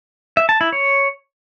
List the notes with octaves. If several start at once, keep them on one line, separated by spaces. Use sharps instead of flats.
E5
A5
E4
C#5